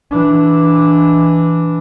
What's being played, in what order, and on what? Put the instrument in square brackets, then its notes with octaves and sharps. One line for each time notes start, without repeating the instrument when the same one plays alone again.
[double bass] E3 D4